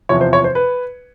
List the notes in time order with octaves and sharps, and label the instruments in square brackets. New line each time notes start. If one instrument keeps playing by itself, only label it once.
[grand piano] E2 C3 F3 C#5
C5
C#5
C5
B4